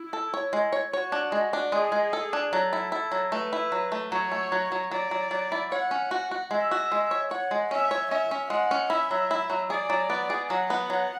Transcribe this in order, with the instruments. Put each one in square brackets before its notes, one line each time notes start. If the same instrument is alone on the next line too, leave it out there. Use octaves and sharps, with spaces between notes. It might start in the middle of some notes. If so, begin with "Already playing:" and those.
Already playing: [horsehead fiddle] E4
[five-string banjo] A4
C#5
G#3
C#5
[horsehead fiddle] F#4 [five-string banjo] C#5
[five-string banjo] D4
G#3
D4
[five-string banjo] G#3 [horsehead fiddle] G#4
[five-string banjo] G#3
A4
D4
[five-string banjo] F#3 [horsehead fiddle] A4
[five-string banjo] E4
E4
F#3
[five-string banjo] A3 [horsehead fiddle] B4
[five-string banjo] E4
F#3
A3
[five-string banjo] F#3 [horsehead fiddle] C#5
[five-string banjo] A3
F#3
F#3
[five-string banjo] F#3 [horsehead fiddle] D5
[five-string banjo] F#3
F#3
E4
[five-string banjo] C#5 [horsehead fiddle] F#5
[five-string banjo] C#4
F#4
F#4
[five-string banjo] G#3 [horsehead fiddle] E5
[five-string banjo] F#4
G#3
C#5
[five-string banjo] C#5 [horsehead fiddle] F#5
[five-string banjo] G#3
[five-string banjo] C#4 [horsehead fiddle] E5
[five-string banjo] C#5
[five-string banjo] C#4 [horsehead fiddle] E5
[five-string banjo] C#4
[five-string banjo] G#3 [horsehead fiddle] F#5
[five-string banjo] C#4
[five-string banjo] E4 [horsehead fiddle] E5
[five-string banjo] F#3
E4
F#3
[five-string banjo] G#4 [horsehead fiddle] D5
[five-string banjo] F#3
B3
G#4
[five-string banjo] F#3 [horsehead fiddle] F#5
[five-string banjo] B3
F#3